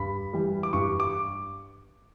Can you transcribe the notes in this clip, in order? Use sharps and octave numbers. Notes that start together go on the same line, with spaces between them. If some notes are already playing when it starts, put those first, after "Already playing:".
Already playing: G2 B5
E3 G3
D6
G2 C#6
D6